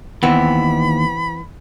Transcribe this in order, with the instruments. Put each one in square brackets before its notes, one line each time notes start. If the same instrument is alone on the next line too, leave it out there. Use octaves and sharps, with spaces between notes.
[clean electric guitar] D#2 [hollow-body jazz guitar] E3 B3 C4 [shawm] B5